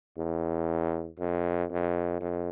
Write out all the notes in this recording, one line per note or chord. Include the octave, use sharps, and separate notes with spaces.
E2
F2
F2
F2